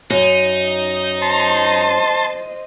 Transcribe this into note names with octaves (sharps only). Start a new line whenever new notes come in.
F#2 D#4
C5 D#5 A5 C6